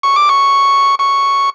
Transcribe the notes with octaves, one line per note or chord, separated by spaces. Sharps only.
C#6
D6
C#6
C#6